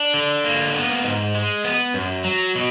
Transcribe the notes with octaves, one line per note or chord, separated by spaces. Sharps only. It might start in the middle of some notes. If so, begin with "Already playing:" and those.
Already playing: D4
D3
A#3
B3
G#2
G#3
B3
F#2
F#3
B2